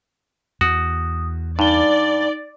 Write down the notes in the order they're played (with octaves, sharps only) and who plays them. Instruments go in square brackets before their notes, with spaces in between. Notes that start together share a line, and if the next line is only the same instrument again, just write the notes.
[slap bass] E2 [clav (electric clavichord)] F#4 [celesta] D#6
[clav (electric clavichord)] G2 [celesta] D#4 G7 [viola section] D5